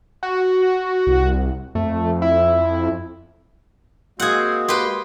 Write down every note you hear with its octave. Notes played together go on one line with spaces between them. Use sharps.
F#4
C2
F2 A3
E4
G#3 A#3 C4 F#4 G#4 F#5
G4 B4 C6